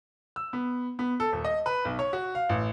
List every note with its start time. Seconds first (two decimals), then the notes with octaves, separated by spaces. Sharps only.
0.36 E6
0.53 B3
0.99 B3
1.20 A4
1.32 D#1
1.45 D#5
1.66 B4
1.85 B1
1.99 C#5
2.13 F#4
2.35 F5
2.49 A1